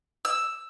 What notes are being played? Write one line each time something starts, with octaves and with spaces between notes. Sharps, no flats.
E6